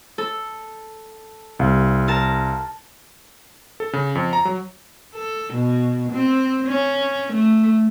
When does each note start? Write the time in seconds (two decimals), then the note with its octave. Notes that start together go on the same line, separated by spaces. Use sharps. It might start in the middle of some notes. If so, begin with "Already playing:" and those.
0.18 A4
1.59 C2 F5
2.08 A#4 A5
3.80 A4
3.93 C#3
4.15 F2
4.33 A#5
4.45 F#3
5.14 A4
5.53 B2
6.12 C4
6.67 C#4
7.33 A3